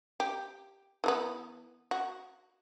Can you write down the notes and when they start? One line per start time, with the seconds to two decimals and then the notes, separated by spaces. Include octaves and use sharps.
0.20 G4
1.04 E3 A3 B3
1.91 F#4